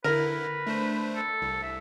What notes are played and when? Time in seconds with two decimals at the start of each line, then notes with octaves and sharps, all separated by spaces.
0.04 D3 E4 A#4 B4
0.67 A3 D4 C5
1.16 A4
1.42 C2
1.63 E5